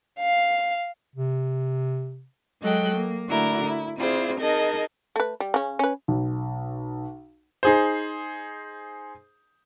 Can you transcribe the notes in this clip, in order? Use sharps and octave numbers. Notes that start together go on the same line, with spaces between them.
F5
C3
F#3 G#3 A4 D#5 G5 F#6
A#3
D3 A3 E4 F#4 A#4 D5
E4
C4 E4 F4 G#4 C5 D5
D#4 G#4 A#4 D#5 A5
A3 B4
G3
C#3 C#4
C#4 B4
B1
D#4 G#4 C5